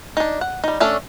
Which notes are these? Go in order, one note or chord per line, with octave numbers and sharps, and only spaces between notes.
D4 D#4
F#5
G3 D#4
A3 C#4 D4 A4